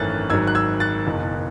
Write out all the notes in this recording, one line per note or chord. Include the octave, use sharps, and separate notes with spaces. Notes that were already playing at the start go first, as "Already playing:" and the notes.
Already playing: G#1 F#2 E3 A3 C#4 F#6 A6
G#1 G#2 F#3 E6 G#6
F#6
E6 G#6
F#6 A6
F#1 E2 B2